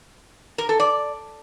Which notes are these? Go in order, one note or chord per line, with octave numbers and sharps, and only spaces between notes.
A#4
A4
D5